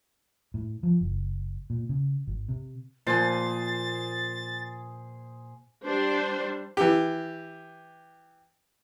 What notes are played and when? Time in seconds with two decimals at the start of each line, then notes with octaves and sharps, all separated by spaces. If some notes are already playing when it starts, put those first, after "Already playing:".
0.54 A2
0.83 F3
1.01 F#1
1.70 A#2
1.89 C#3
2.27 G#1
2.49 C3
3.07 A#2 F3 A#3 G#4 C5 C6 A6
5.84 G3 D4 C5
6.77 E3 G4